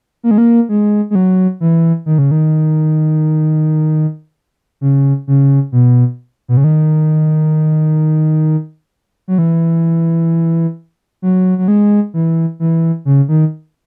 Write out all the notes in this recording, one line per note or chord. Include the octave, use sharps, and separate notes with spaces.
A#3
G#3
A#3
G#3
G#3
F#3
E3
D#3
C#3
D#3
C#3
C#3
B2
B2
C#3
D#3
F#3
E3
F#3
F#3
G#3
E3
E3
C#3
D#3